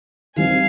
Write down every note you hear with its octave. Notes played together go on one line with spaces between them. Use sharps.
D#3 G3 C4 D#4 F5 G#5